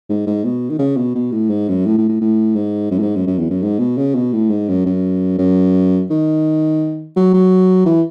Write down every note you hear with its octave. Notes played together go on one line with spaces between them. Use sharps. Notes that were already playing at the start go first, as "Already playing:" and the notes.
G#2
G#2
B2
D#3
C#3
B2
B2
A2
G#2
F#2
A2
A2
A2
A2
G#2
F#2
A2
G#2
F#2
F#2
E2
F#2
G#2
B2
C#3
B2
A2
G#2
F#2
F#2
F#2
D#3
F#3
F#3
E3